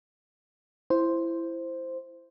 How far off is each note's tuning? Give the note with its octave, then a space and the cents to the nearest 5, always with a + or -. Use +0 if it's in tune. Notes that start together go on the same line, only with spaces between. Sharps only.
E4 +15 C5 +0